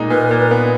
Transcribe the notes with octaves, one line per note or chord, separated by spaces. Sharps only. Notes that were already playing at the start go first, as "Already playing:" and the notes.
Already playing: A#2 G#3 D#4
A#2 B4
A#2 A#4
B4
B3